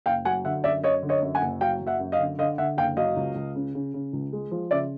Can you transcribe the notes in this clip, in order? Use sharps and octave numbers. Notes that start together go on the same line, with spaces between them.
F#1 F5 G5
F#3 F#5 G#5
D3 E5 F#5
F#2 D5 E5
F#2 C#5 D#5
D3
C#5 D#5
F#2
F#5 G#5
F#1
F#3 F5 G5
F#1
E5 F#5
F#2
D#5 F5
D3
D3 D#5 F5
D3 E5 F#5
F#1 F5 G5
F#3 D#5 F5
C#2
C#2
C#3
C#3
C#3
C#2
G#3
F3
C#3 D5 E5